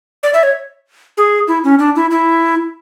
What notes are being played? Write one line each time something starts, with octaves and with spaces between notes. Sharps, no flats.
D5
E5
C#5
G#4
E4
C#4
D4
E4
E4